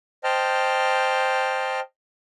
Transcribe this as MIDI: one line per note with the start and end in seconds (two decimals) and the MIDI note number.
0.24 1.80 72
0.24 1.80 75
0.24 1.80 79
0.24 1.80 81
0.24 1.80 89